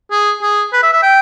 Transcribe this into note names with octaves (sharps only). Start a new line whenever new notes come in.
G#4
G#4
B4
E5
E5
G5